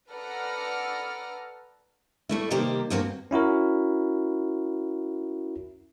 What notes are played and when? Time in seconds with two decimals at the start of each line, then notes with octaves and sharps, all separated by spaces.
0.10 A4 B4 D5 F#5 A#5 F6
2.29 G3 A3 E4
2.51 C3 D#3 G3 A#3 G4 C5
2.90 D2 G2 A#3 C4 F#4
3.31 C#4 E4 F#4 A#4